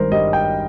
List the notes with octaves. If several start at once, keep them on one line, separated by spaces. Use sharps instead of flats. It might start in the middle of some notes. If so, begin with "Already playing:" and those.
Already playing: G#1 G2 G3 A#4 C5
G2 G3 D#5
G5